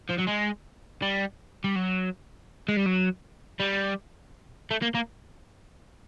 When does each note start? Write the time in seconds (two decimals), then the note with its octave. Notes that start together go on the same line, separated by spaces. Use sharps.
0.10 F3
0.19 F#3
0.28 G#3
1.02 G3
1.64 G3
1.76 F#3
2.68 G#3
2.77 G3
2.86 F#3
3.60 G3
4.71 A3
4.82 A#3
4.95 A#3